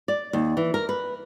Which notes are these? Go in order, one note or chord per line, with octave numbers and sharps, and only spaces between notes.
D5
D#2
E3
A#4
B4